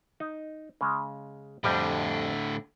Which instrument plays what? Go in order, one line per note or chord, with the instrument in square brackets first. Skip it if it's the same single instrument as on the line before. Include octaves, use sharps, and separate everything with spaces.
[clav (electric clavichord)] D#4
C#3 G#3
[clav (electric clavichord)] F2 G3 [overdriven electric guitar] A2 D3